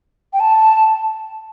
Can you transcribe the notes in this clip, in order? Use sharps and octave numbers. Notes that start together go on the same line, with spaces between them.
G5
A5